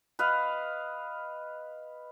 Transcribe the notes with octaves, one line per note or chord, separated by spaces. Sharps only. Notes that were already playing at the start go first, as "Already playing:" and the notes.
B4 D#5 F5